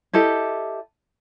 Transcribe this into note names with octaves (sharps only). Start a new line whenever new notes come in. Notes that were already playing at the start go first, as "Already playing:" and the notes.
E4 G4 A4 D#5